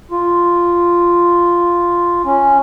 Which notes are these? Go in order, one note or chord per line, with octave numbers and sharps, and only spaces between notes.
F4
C#4